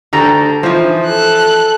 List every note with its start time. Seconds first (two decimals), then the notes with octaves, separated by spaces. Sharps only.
0.13 D2 G4 A4 A#5
0.63 E3 F3 D#4 C5
1.06 A4 F#6